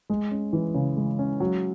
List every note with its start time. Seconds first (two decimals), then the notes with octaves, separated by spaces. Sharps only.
0.10 G#3
0.31 C#4
0.53 E3
0.74 C#3
0.97 G#3
1.19 C#4
1.40 F#3